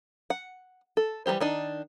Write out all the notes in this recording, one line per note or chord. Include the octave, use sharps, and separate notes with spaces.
F#5
A4
E3 G3 A#3 G4 C5
D#3 D4 D#4